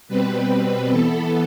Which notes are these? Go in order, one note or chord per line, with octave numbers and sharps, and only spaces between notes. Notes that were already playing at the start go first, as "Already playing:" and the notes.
B2 G3 C4 B4
E3 B3 A4